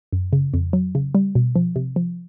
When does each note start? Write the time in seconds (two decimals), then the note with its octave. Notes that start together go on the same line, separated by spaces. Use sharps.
0.13 F#2
0.33 C#3
0.54 F2
0.73 F#3
0.95 C#3
1.15 G3
1.35 B2
1.56 F3
1.76 C3
1.96 F3